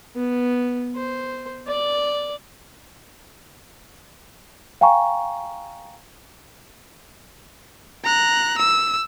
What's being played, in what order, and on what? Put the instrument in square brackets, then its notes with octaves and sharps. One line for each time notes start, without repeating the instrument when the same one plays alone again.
[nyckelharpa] B3
C5
D5
[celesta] F5 G5 G#5 A#5 C#6
[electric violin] A#5 F#6
E6